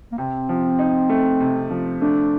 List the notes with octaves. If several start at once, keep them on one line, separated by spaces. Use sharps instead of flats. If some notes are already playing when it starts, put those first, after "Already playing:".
A#3
C3 C4
F3
D#4
A3
C3
F3
A3 D4